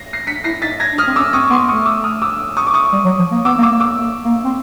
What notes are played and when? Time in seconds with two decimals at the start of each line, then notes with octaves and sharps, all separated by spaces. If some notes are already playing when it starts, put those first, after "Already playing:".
Already playing: A#6 C7
0.13 A#6 C7
0.27 D4 B6 C#7
0.44 E4 A#6 C7
0.62 D#4 A6 B6
0.80 G#6 A#6
0.93 D4
0.98 D#6 F6
1.07 C4
1.16 C#4 D6 E6
1.33 C4 C#6 D#6
1.50 B3 C6 D6
1.68 A3 C#6 D#6
1.85 D6 E6
2.04 D#6 F6
2.22 D6 E6
2.57 C#6 D#6
2.67 D6
2.74 C#6 D#6
2.92 G3
3.05 F#3
3.19 F3
3.32 A#3
3.45 B3 D6 E6
3.58 A#3
3.62 D6 E6
3.71 A#3
3.80 D6 E6
3.98 A#3
4.24 A#3
4.45 C4